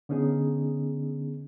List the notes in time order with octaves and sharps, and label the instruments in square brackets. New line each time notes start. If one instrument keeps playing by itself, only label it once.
[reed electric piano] D3 B3 C#4 D#4 G#4